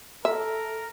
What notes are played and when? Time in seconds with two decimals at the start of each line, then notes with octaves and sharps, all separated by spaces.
0.25 A4 A#4 E5